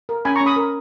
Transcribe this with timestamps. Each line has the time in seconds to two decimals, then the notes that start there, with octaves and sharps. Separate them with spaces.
0.09 A#4
0.25 C#4 G#5 B5
0.36 A#5 C#6
0.41 C#4
0.46 B5 D#6
0.56 A#4